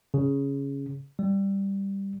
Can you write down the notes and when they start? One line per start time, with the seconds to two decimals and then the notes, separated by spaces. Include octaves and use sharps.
0.14 C#3
1.19 G3